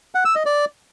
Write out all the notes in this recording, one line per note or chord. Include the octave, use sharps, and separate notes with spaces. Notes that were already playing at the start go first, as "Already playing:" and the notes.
F#5
E6
D#5
D5